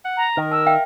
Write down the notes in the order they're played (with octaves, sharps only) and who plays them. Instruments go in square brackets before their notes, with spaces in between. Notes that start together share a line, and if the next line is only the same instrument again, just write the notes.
[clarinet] F#5
[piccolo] A#5
[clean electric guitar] D#3 [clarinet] A#4
[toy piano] A5 [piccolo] E6
[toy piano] E5 F5 G5